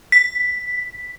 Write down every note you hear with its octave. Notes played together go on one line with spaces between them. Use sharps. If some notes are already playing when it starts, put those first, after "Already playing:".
B6